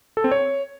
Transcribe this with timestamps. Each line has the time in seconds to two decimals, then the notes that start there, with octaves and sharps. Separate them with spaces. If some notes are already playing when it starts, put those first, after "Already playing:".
0.17 A4
0.24 C4
0.31 C#5